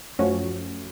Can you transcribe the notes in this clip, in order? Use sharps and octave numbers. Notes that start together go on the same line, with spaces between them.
F#2 F3 A3 C#4 F#4